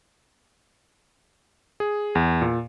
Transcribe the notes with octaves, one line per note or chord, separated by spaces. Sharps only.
G#4
E2
A#2